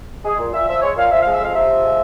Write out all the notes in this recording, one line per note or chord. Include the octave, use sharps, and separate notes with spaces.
G#3 G#4
A#2
A#2 E5
F3 E5
G#3 C#5
A#2 F5
F3 E5
F5
G#3
E5
F2 F5
C3 E5
F3
G#3